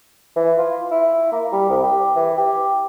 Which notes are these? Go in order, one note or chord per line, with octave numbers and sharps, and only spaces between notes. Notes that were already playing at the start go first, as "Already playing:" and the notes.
E3
F4
E4
A#3
G3
C2
G4
E3
G4